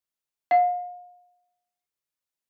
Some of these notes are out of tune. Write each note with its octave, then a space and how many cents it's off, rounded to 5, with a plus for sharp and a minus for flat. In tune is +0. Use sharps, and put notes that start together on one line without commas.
F5 +40